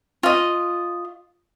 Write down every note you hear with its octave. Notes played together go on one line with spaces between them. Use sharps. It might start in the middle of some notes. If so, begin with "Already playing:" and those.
F4 D#5